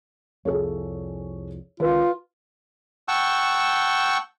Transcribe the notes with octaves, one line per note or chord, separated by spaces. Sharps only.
C2 F2 G#4 A4 C#5
C#2 D#3 F4 B4
F#5 G5 A5 C#6 E6 G6